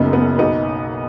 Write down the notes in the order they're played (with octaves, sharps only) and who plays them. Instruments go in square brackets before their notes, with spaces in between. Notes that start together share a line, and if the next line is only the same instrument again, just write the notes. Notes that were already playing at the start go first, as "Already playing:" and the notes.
Already playing: [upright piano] F#1 F#2 C#3 B3 D#4
B3
B1 B2 B3 D#4